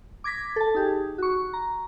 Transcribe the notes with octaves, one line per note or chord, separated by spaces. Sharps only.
D6 G#6 A#6 B6
A4 A5
D#4 G4 G#4
F#4 C#6
A#5